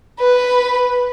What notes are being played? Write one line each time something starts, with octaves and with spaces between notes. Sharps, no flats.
B4